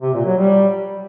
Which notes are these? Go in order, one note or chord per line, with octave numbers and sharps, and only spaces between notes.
C3
A#2
F#3
G3